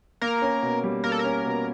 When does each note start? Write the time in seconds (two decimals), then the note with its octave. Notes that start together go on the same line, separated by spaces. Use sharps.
0.22 A#3 A#4
0.42 C#4
0.62 B2
0.84 G3
1.04 A#3 A#4
1.12 A4
1.19 A#4
1.24 C#4
1.45 B2